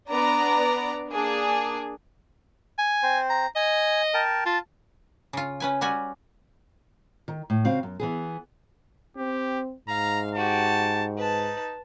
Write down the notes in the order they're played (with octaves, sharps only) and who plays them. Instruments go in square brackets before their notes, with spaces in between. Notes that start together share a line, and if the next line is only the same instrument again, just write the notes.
[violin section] B3 D4 D5 A#5
A#3 D4 G#4
[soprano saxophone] G#5
[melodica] C4 C5
[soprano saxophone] A#5
[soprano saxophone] D#5 [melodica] G#5
[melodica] A#4 G5 A5
[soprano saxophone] F4 [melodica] A5
[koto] C#3 F4
C#4 B4 G#5
G3 C#4 F#4 G#5
[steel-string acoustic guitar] D#3
A2
C#3 C4 F#4 F5
F#2
E3 B3 G#4
[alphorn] C4 [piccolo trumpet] G4
[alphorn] G#2 [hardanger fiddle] F5 [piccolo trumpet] A#5
[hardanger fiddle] F#4 G4 [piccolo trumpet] A5
[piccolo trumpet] D#4 [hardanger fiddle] B4 A5